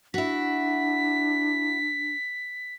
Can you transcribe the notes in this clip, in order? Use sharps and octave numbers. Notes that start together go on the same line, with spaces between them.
D4 E4 F#4 B6